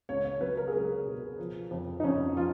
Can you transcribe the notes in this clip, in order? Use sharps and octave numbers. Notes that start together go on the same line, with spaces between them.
C#2 C#5
C#5
F#3 B4
A#4
G#4
C#2 A#4
B2
F3
F2
D#4
F2 C#4
F3 F4